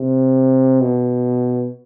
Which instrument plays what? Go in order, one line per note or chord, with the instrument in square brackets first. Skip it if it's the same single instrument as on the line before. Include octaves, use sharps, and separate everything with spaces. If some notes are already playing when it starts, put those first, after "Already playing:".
Already playing: [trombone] C3
B2